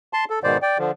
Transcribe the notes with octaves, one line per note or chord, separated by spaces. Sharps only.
A5 C6
A4
G#2 B2 D#3 C5 D5
D5 G5
D3 F3